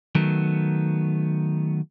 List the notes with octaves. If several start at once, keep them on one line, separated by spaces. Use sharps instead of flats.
D#3 F#3 A3 B3